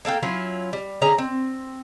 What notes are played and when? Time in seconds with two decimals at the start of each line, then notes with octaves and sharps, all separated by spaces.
0.05 A#3 A4 F5 G5
0.23 F#3 C#4 E4 F4
0.73 G3
1.02 D3 C#4 G#4 A#5
1.18 C4